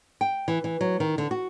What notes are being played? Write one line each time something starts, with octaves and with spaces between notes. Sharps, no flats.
G5
E3
E3
F#3
D#3
D3
F#4